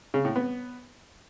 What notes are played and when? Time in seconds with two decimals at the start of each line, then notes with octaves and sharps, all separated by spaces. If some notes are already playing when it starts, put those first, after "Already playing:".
0.14 C#3
0.25 A2
0.36 B3